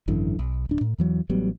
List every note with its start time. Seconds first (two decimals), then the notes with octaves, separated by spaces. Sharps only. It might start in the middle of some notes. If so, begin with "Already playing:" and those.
0.08 G#1 F#2 D3 E3
0.39 B1
0.69 D1 D4
0.81 A2
0.98 E2 E3 F#3
1.30 A1 F#3 G3 B3